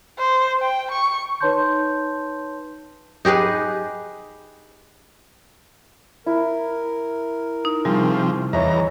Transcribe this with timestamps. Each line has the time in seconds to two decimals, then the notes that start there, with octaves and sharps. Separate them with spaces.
0.18 C5
0.59 G5
0.92 C#6
1.41 D#4 B4 C#5 A5 C6 G6
3.25 D#4 G4 G#4 B4
6.26 E4 A#4
7.65 D#4
7.85 C3 F3 G3 G#4 C#6
8.53 E2 C#5 D#5 E5 A#5